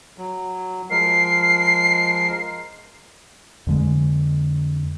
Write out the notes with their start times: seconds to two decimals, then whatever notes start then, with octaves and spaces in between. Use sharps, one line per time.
0.18 F#3
0.90 F3 G#3 A#4 C7
3.67 F2 D3 G#3